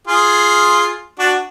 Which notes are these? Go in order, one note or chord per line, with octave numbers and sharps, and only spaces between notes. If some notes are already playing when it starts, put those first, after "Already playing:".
F4 G#4
D4 F#4